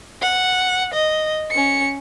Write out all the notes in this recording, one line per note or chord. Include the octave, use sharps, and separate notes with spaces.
F#5
D#5
C#4 C#7